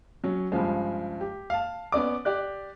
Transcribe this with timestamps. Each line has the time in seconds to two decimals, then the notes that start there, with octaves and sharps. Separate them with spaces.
0.24 F#3 C#4
0.52 G2 C#3 F3 G#3
1.21 G4
1.50 F5 A5
1.92 B3 C#4 D5 D6
2.25 G4 D5 F#6